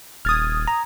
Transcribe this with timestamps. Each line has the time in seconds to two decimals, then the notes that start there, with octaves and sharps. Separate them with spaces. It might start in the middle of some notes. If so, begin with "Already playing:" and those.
0.25 D#1 D#6 F6 G#6 A6
0.68 A#5